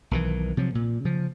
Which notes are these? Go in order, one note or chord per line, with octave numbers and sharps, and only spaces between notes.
B1 D#3 E3
C3 F3 F#3
A#2
C#3 F3